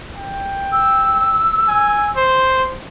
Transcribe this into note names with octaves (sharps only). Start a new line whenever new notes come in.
G5
E6
G#5
C5